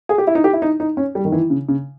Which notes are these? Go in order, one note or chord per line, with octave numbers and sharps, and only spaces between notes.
G#4
G4
E4
D#4
G4
E4
D#4
D#4
C#4
G3
D#3
E3
C#3
C#3